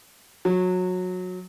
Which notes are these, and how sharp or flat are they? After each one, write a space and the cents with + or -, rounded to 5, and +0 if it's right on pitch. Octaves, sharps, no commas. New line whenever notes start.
F#3 -20